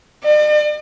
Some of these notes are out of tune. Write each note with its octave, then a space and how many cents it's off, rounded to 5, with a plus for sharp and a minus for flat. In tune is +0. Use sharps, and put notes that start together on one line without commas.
D5 +45